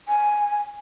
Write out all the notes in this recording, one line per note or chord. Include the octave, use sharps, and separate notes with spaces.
G#5